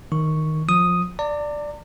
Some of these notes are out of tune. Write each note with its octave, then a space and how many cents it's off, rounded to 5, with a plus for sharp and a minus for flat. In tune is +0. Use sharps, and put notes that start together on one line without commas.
D#3 +0 C#6 +0
F3 +20 D#6 +0
D5 +5 A#5 -45